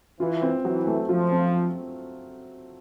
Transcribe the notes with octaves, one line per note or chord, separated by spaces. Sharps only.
E3 F4
C4
E3 F#3
A3
F3 F4
C4